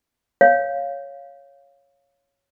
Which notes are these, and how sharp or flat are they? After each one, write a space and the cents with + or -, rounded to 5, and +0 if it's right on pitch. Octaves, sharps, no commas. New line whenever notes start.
C#5 +0 F5 +0